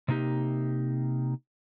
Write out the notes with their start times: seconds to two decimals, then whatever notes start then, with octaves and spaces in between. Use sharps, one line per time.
0.08 C3 A#3 D#4 G4